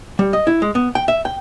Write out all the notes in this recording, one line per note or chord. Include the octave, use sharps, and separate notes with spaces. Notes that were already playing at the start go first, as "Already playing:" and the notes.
G3
D#5
E4
G#3
B3
G5
E5
G5